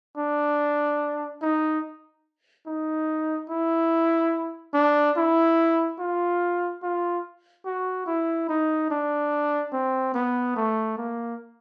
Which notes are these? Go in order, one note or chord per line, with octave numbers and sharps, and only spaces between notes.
D4
D#4
D#4
E4
D4
E4
F4
F4
F#4
E4
D#4
D4
C4
B3
A3
A#3